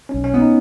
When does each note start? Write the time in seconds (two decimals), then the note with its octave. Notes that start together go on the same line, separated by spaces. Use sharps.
0.09 C#4
0.14 B1
0.24 C#4
0.34 B3
0.39 D#4